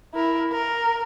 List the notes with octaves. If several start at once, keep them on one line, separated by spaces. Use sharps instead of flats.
E4 A#4
A#4